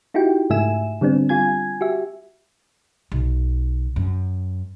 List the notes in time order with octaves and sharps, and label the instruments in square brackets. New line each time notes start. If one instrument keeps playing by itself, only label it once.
[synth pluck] D#4 E4 F#4 G4 G5
G#2 C#3 A3 E5 G#5 E7
D3 G3 B3 C4 D4
G3 F4 G#5 G#6
F#4 G4 E5
[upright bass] B1
F#2